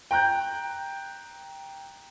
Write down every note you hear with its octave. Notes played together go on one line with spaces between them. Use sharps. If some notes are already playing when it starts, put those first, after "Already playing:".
G5 A#5 F#6 G6